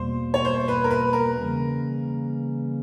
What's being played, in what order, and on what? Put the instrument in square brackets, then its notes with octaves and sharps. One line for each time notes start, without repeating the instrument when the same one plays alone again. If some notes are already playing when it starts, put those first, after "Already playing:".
Already playing: [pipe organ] E2 B2 G3 A#3 [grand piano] C5
[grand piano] C#5
C5
B4
A#4
B4
A#4
[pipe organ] C#3 E3 G3 A#3 C#4